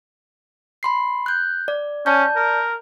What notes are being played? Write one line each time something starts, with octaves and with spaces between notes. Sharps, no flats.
B5 C6 C7
F#6 G6
D5
C#4 D5 A5 G6
A#4